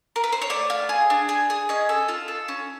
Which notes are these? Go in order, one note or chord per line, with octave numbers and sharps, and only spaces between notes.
A#4
B4
C5
C#5
A3 D5
F4
G#4
D4
G#4
G#4
C#4 D#5
A4
F4
A4
C#4